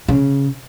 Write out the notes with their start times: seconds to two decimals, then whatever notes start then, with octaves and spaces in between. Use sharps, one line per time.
0.08 C#3